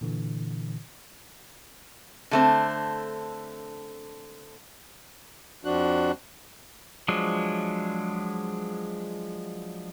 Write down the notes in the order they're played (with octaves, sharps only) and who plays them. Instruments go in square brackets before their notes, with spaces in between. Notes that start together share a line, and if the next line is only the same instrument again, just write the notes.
[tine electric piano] A#2 D3 E3
[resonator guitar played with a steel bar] D3 A3 C4
[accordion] F2 F3 D4 F#4 F#6
[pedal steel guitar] F3 F#3 G#3 D4